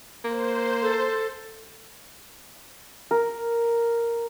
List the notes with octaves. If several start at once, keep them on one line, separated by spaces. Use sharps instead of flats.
A#3 C5
A4
A#4